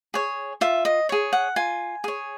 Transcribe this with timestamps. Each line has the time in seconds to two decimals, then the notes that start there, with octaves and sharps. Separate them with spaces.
0.14 G#4 C#5
0.61 F4 E5
0.85 D#5
1.09 G#4 C#5
1.33 F#5
1.56 F4 G#5
2.04 G#4 C#5